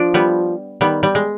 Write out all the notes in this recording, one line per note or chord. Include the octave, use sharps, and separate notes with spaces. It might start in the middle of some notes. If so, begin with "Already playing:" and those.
Already playing: F3 D4
G3 B3
D#3 G3 B3
G3
G#3